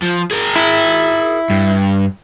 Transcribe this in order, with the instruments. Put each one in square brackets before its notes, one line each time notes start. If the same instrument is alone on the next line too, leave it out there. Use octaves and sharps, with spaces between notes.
[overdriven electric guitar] F3
G#4 A#4
[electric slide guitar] E4
[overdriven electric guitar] G2